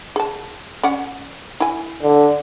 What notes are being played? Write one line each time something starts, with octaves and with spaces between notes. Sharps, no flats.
G#4 A5
C#4 D5 F#5
E4 G#5
D3